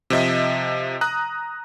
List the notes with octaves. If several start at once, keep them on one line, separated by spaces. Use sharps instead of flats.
C3 F3 D#5 E5
A#5 D#6 F#6